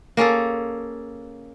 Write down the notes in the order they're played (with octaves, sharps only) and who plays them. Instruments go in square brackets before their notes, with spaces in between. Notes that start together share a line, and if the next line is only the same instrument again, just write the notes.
[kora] A#3 C#4 G#4 A4